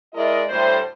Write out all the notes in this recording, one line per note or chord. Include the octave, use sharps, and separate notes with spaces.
G#3 E4 A#4 D5 D#5
D2 A2 G3 C5